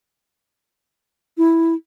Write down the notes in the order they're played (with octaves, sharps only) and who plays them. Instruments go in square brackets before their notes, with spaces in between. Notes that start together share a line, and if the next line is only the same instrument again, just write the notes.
[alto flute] E4